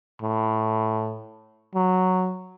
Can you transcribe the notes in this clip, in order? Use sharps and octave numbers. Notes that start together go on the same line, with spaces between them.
A2
F#3